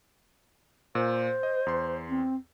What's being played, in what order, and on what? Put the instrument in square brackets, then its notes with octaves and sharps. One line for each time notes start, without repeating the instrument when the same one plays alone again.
[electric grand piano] A#2 [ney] C5
[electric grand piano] D#5
E2 C6
[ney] C4